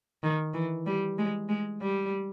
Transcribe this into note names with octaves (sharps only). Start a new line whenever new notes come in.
D#3
E3
G3
G#3
G#3
G3